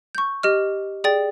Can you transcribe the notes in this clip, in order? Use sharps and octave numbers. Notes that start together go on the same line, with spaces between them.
C#6 G6
G4 D#5 F6
G#4 D5 G5 A6